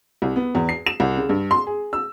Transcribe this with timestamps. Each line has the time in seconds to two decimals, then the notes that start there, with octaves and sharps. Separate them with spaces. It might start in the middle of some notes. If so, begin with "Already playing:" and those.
0.22 C2
0.36 B3
0.55 E2
0.69 C7
0.86 E7
1.00 C2
1.17 C#3
1.29 G2
1.51 C6
1.67 G#4
1.93 E6